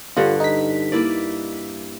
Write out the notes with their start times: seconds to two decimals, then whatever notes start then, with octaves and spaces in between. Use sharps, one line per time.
0.17 G2 D3 G3 F4 F#5
0.40 D#4 B6
0.92 A#3 E4 D5